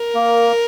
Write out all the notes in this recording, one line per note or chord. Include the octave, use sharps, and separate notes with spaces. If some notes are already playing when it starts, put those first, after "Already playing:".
Already playing: A#4
A#3